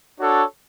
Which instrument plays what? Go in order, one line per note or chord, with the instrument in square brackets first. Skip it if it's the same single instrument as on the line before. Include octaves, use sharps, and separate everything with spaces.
[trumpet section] D4 F#4 A4 C#5